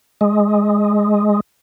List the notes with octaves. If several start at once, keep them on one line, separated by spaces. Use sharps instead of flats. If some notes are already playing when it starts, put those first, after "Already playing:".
G#3